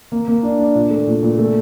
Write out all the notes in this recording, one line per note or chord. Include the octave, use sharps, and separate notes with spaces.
A#3
A#3
D4
D4
A#2
A3
A#2
A#2
A3